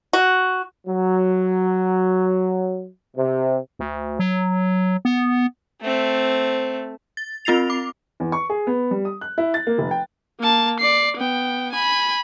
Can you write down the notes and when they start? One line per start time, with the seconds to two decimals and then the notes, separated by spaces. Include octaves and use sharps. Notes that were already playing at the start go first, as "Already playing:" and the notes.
0.13 F#4
0.87 F#3
3.17 C3
3.79 D2
4.19 F#3
5.05 B3
5.81 A3 C4
7.17 A6
7.45 C4 F4 A6 C7 F7
7.70 D6
8.20 E2
8.32 C#6
8.49 G#4
8.67 B3
8.91 G3
9.05 D#6
9.21 F#6
9.38 E4
9.54 A6
9.67 A#3
9.78 F1
9.91 G5
10.40 A#3 A5
10.80 D5 C7
11.17 B3 G5
11.73 G#5 B5